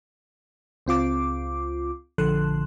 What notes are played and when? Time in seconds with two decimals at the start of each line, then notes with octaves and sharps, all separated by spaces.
0.86 C#2 C4 F4 D6
2.18 A#1 D3 F3 A4 C6 F#6